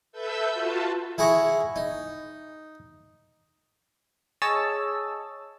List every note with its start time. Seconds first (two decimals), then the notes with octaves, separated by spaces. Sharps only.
0.12 A4 B4 E5 E6 G6
0.52 F4 F#4 A5
1.18 E4 G#4 F#5 A#5 C#6
1.76 D#4
4.42 G#4 C#5 D#5 A5 E6